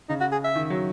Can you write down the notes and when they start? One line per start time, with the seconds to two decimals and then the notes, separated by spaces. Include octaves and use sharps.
0.09 C#3 D#4
0.20 F#4
0.32 G#4
0.44 E5
0.55 D#3
0.70 F#3